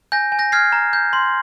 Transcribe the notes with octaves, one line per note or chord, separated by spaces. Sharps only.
G#5 G6 A#6
G#5
G6 A#6
F6 G#6 C7
A#5
G6
C6